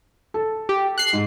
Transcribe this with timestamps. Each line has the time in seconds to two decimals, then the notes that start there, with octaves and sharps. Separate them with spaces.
0.34 A4
0.69 G4
0.98 F#6 C7
1.13 G#2